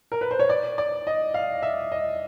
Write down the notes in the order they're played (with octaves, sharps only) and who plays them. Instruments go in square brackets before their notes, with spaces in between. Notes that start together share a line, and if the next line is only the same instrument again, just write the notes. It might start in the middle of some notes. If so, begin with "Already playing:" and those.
[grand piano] A#4
B4
C5
C#5
D5
D5
D#5
F5
E5
D#5